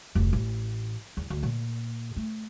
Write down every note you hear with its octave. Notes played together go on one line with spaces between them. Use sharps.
F1 D2
A1
E2
D2
A#2
A3